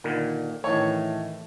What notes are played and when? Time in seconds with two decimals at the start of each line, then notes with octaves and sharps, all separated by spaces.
0.04 A#2 D3 D#3
0.64 A2 D#3 E3 A3 C#4 C#5